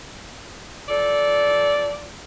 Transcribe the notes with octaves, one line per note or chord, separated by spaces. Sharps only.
F3 A4 D5